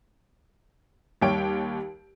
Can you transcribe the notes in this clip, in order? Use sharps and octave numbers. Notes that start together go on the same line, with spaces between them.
D#2 G3 G4 C#5 G5 D7